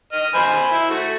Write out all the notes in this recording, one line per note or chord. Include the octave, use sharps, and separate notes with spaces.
D#5 F6
C5 G#5 B5
E4
A3 F#4